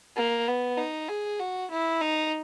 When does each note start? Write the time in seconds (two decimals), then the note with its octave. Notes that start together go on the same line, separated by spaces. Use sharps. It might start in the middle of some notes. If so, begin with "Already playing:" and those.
0.17 A#3
0.48 B3
0.78 D#4
1.09 G#4
1.40 F#4
1.71 E4
2.01 D#4